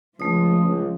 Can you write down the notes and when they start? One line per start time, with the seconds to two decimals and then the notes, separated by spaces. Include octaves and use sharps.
0.20 C#2 F3 A3 D#6
0.64 C#2